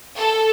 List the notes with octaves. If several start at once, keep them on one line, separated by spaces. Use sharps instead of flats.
A4